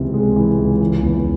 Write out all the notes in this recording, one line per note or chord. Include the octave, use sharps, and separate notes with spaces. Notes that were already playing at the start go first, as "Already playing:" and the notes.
Already playing: C#2 C3 E3
G#3
E3
C#2
E3
E2